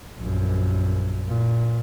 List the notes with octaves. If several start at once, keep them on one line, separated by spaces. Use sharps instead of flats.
A#1 F#2
A#2